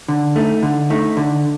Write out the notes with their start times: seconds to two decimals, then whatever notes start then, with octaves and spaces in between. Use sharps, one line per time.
0.08 D3
0.36 A3 D#4
0.63 D3
0.90 A3 D#4
1.17 D3